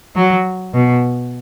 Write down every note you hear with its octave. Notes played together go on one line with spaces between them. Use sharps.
F#3
B2